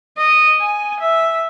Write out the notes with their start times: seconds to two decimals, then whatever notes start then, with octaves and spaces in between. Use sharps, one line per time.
0.18 D#5
0.61 G#5
1.00 E5